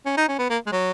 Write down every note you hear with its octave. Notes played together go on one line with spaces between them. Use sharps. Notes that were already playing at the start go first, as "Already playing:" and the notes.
C#4
D#4
C#4
B3
A#3
G#3
F#3